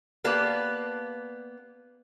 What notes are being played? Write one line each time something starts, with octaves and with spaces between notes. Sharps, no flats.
A#3 B3 G4 D5 A5